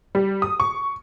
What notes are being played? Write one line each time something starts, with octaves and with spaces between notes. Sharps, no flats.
G3
D#6
C#6